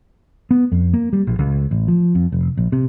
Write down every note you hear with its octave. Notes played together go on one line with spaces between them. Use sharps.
B3
F2
A#3
G3
A#1
C#2
A1
F3
F2
F1
A#1
C3